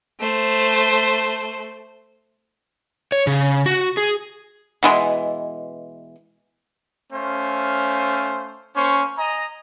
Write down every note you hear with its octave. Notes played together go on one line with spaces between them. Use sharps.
A3 C5
C#5
C#3
F#4
G#4
B2 E3 G#3
A3 C#4 C5 F5
A#3 C#4 C5 C#6
D#5 G#5 A#5